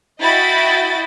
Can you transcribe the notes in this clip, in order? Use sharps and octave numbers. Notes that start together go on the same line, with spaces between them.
E4 F#4 D#5 G5 B5 A6